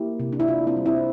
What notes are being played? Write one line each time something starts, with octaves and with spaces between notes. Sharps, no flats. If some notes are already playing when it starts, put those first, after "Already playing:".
Already playing: A#3 E4 G4
C3
D4
E4
C3 D4 F4
C4 E4
G3
C4 E4